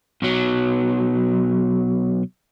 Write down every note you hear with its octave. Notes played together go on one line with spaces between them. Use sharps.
B1 F#3